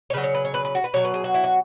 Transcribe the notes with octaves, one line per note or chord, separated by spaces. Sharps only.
C#5
C#3 F#3 B4
C#5
B4
C#5
B4
B4
F#4
B4
B2 F#3 C#5
B4
G#4
F#4
E4
F#4